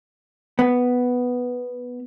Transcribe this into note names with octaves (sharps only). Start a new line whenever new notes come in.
B3